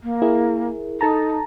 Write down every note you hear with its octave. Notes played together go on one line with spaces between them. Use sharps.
A#3
E4 G#4 A#4
D#4 A4 A5 A#5